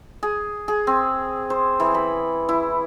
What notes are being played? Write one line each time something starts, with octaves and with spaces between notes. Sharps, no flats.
G#4
G#4
C4
C5
E3
B5
E4